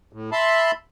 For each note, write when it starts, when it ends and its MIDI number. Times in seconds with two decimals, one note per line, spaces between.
0.13 0.30 45
0.32 0.71 76
0.32 0.71 81
0.32 0.71 83
0.32 0.71 84